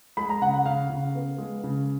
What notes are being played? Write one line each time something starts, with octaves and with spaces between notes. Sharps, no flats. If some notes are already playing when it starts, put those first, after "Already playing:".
G#3 B5
A#5
C#3 F#5
F#5
C#3 F5
C#3
B3
G#3
C#3